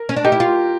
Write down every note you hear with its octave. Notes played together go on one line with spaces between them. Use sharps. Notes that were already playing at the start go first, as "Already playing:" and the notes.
Already playing: A#4
C#4
D4
D#4 G4
E4
F4